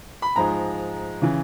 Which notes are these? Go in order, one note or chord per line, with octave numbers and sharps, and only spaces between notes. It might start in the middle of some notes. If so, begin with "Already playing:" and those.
B5
G#2 F3 G#3 A#5
C#3 E3